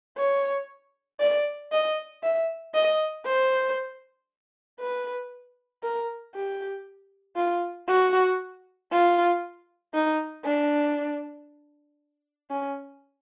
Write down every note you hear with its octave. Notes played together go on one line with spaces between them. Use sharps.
C#5
D5
D#5
E5
D#5
C5
B4
A#4
G4
F4
F#4
F4
D#4
D4
C#4